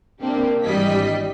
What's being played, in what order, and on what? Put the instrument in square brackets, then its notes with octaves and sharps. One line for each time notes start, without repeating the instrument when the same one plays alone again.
[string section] C3 A#3 C4 D4 G4
G#1 G2 E3 G3 D#5 B6